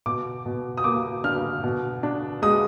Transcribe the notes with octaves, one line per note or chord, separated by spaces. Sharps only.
B2 D6
B2
D#6
A#3 D6
D4 F6
B2
D4
G#3 D#6